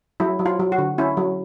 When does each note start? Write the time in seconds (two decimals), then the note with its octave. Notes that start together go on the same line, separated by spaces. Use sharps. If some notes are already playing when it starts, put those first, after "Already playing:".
0.20 F#3 E4
0.39 F#3
0.46 F4
0.60 F#3
0.72 F#4
0.78 D3
0.98 C#4 E4
1.17 F#3